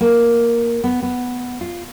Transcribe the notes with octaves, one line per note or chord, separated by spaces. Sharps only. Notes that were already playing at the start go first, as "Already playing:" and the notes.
A#3
B3
B3
F4